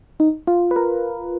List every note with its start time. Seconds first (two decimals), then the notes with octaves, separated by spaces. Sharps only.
0.20 D#4
0.47 F4
0.71 B4
0.76 A#4